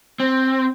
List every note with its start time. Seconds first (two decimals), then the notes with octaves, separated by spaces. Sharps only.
0.20 C4